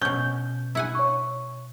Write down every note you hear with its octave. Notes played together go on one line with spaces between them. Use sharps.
B2 C#4 G6
E4 F#5 G#5
C#5 C#6